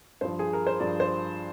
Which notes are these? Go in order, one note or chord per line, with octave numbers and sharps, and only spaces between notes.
G2 F3 C5
G#4
A#4
C5
G2 F3 D5
C5